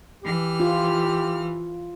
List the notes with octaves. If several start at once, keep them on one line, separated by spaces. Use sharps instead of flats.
E3 G4 F6
F4